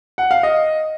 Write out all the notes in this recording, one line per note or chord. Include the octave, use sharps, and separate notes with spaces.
F#5
F5
D#5